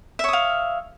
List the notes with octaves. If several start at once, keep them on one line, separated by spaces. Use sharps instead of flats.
C#5 E5 F5 D#6